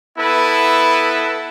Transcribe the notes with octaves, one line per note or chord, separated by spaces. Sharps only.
B3 E4 A4 B4